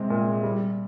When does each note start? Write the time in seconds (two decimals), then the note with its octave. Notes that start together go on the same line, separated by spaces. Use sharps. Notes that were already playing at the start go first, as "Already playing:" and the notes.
Already playing: C3 G#3 C4
0.10 A#2
0.43 G3